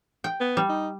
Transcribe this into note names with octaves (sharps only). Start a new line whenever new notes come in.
G5
B3
G3
D#4